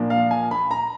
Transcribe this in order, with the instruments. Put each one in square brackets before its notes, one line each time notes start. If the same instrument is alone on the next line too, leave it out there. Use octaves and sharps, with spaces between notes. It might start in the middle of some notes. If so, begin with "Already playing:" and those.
Already playing: [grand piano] A#2 F3 A#3 D4
F5
G#5
B5
A#5